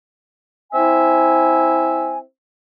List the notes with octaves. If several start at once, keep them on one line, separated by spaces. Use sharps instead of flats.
C4 E4 E5 G#5